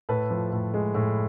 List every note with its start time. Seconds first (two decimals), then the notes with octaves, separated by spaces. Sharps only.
0.09 A2 A4 B4
0.31 F3
0.52 A2
0.74 G#3
0.95 A2